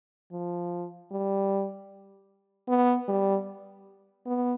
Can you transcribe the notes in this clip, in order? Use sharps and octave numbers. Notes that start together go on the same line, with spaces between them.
F3
G3
B3
G3
B3